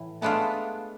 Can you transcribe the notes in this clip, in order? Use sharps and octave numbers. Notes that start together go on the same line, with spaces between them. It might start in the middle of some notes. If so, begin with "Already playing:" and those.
Already playing: A2 E3
G#3 A3 B3 D4 F4